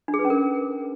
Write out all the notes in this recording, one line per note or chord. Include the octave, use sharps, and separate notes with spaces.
D4
G#4
B4
C#4
A#4